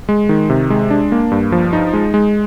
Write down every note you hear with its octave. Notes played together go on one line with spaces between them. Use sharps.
G#3
D#3
C3
G#3
D4
A#3
G2
F3
D#4
G#3
G#3